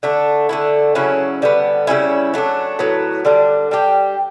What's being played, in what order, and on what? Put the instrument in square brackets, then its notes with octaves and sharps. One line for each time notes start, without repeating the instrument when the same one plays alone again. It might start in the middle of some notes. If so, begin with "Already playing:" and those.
[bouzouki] D3 A3 D4
D3 A3 E4
C#3 F#3 C#4 E4
D3 G3 B3
C#3 G3 C#4 E4
F#3 A3 D4
A2 F#3 B3
D3 G3 D4
G3 D4 G4